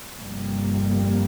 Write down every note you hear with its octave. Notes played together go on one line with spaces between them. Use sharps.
G1 F2 C3 G3 A#3